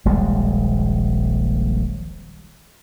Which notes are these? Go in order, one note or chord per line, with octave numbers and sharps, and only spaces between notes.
D#1 A#1 G3 G#3